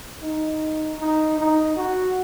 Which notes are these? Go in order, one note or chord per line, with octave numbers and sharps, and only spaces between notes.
D#4
D#4
D#4
F#4